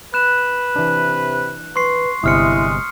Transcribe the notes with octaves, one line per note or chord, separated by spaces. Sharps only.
B4 F#6 E7
C3 E3 D4
B4 C6 C#6 C7
G1 C3 G#3 E4 D#6 F6 C#7